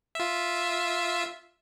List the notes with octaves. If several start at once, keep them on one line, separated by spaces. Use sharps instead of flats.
F4 E5